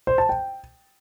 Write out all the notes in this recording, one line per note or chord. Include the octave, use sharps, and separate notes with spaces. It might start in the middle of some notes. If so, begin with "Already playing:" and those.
C5
A5
G5